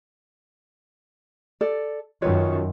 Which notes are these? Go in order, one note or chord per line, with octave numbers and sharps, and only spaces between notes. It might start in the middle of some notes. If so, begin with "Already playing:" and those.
A4 D5
F#2 D#3 F4 B4 C#5